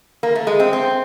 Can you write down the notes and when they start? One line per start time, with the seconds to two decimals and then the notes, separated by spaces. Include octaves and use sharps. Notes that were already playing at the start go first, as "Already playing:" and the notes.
0.23 A#3
0.35 A3
0.47 G#3
0.60 C4
0.73 C4